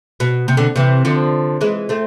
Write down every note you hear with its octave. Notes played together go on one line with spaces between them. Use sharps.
B2
C3
B2 D3
C3 E3
D3 F3
E3 G#3
A3 C4